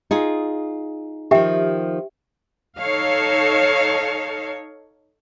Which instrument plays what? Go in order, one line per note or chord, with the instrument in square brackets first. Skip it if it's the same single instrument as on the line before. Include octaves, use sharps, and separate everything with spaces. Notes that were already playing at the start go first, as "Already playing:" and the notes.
[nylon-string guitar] D#4 F4 G#4
[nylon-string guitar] D#3 F3 [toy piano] G4 E5 G5
[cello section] D#4 A4 C#5 F5